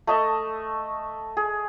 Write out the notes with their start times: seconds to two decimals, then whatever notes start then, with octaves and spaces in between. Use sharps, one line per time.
0.07 A3 D#5 E5 A5
1.37 G#4